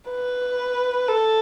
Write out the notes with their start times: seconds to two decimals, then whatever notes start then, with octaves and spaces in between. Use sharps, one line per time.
0.11 B4
1.08 A4